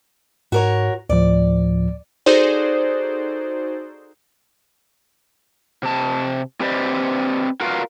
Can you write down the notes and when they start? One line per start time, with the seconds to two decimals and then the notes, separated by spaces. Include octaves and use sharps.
0.52 G#2 F#4 A#4 C#5
1.09 D2 A2 F3 D5
2.26 D#4 F#4 G#4 A4 C5 D5
5.83 C3 A5
6.60 C4 G4 B4 C5 D5 D#5
7.61 F4 F#4 A#4 B4 F5